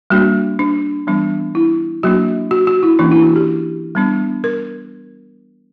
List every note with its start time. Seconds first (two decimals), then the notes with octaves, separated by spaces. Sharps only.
0.10 G3 A#3 D4 F#4
0.59 D4
1.07 E3 G3 B3 D4
1.55 E4
2.03 F#3 A#3 D4 F#4
2.51 F#4
2.67 F#4
2.83 E4
2.99 E3 A#3 C#4 D4
3.11 E4
3.23 F#4
3.36 G4
3.95 G3 B3 D4
4.44 A#4